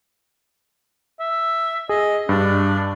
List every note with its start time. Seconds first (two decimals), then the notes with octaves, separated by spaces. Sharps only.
1.20 E5
1.89 G#4 D#5
2.29 G2 D4